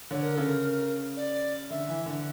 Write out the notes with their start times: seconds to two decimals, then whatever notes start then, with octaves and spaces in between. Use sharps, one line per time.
0.11 D3 C#5
0.23 A#4
0.35 C#3 A4
0.47 A#4
1.17 D5
1.70 D3 E5
1.89 E3
2.06 D3